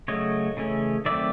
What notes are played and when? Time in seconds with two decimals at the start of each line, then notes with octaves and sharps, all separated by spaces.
0.08 C#3 F#3 A3 C#5 D#5
0.57 C#3 E3 A3 C#4
1.05 D#3 F#3 A3 C4 D5 E5